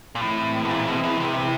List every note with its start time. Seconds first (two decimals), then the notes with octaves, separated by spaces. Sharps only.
0.15 A#2
0.21 A2 E3 G#3 C4 E4
0.65 B2
0.71 A#2
0.87 B2
1.04 B2
1.20 C3